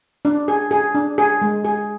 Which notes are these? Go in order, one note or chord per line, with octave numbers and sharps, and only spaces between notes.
D4
G#4
G#4
D4
G#4
G#3
G#4